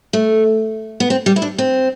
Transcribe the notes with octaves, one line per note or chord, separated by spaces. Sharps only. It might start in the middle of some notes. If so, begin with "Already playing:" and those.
A3
B3
C4
G3
E4
D4
C4